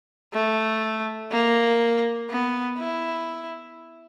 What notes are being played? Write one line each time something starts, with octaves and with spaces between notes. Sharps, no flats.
A3
A#3
B3
E4